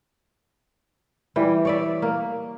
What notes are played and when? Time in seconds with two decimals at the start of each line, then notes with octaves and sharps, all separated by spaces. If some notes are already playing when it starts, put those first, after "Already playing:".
1.36 E3 G3 G5
1.65 C#5 D5 E5
2.02 A#3